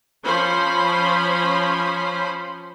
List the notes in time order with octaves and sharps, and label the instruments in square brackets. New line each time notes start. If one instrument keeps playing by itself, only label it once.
[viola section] F3 C#4 C5 B5